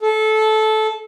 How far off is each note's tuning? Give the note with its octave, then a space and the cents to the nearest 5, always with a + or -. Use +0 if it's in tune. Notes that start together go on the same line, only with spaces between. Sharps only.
A4 -20